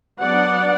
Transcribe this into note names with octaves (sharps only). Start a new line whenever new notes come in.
F#3 B3 D4 D5 F#5